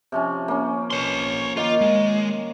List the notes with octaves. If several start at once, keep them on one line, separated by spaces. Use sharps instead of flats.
C3 F3 C#4
A#3 C#4
C#5 C6
D#3 A#3 F4
G#3